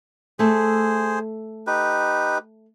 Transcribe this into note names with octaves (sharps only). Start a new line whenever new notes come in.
A3 G#4 A4 C5
D#4 G4 B4